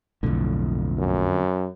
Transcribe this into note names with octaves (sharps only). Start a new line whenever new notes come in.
B1 F2 A2 D3
F#2